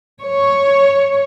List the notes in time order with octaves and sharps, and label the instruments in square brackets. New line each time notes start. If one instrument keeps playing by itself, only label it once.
[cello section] C#5